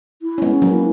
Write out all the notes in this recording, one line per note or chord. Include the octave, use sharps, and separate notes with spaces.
E4
C#4
G#3 B3
C#4
F#3 A#3
E4